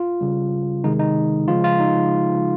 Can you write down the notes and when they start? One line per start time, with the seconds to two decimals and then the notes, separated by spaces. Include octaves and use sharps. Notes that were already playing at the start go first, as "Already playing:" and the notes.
Already playing: F4
0.21 C#3 G3
0.84 C3 D#3 G#3 D#4
0.99 D#4
1.48 C#3 F3 G#3 F4
1.64 F4
1.80 D#4